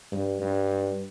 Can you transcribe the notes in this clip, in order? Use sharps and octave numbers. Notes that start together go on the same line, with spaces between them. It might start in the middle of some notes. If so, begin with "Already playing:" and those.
G2
G2